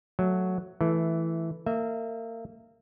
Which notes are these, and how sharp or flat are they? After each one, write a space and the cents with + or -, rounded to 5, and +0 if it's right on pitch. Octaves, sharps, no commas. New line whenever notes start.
F#3 +0 A3 +0
E3 +0 A3 -10
A#3 -35 E5 -20